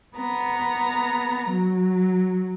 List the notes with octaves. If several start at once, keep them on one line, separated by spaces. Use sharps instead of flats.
B3 A#5
F#3